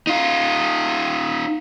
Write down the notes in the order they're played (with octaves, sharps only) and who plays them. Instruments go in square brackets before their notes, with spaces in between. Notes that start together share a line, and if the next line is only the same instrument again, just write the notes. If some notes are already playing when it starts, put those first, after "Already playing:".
[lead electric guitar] D#4 F4